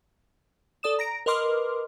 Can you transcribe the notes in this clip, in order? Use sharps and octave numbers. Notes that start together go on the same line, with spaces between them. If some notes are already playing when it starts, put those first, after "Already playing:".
A4 D5 D#6 E7
A#5 A#6 D7
A#4 B4 D#5 C6 D6 F6